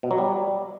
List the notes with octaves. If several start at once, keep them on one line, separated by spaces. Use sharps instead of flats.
B2
F#3
G3